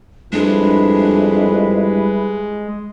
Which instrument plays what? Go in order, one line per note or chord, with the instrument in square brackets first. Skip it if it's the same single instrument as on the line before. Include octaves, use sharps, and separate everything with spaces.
[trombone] F2 [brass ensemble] G3 E4 B4 [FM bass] G#3 [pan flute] D4